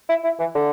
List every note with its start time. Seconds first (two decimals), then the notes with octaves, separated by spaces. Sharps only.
0.09 E4
0.24 E4
0.39 E3
0.55 D3